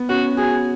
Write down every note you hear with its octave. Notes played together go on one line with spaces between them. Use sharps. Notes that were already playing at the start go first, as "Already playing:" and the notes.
Already playing: B3
C#4 F#4
F#4 G#4